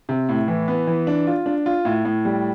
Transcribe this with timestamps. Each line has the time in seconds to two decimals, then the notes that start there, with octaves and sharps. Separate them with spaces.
0.09 C3
0.29 A2
0.48 E3
0.68 B3
0.87 E3
1.07 D4
1.27 F4
1.46 D4
1.66 F4
1.85 A2
2.05 A2
2.25 G3